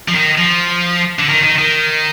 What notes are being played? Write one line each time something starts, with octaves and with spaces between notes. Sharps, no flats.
F3
D#3
F3
D3
D#3
D#3
D#3